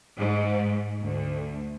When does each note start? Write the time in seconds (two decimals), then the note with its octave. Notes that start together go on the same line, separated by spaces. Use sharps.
0.17 G#2
1.01 D2